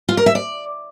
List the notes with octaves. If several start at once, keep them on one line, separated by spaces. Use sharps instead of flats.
F4
A#4
E5
D5